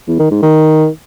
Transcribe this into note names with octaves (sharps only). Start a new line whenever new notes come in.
E2
D#3
G#2
D#3